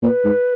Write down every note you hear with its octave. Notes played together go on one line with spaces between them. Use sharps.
A#2 C5
B4
G#2